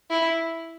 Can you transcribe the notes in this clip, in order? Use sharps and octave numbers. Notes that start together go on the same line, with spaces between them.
E4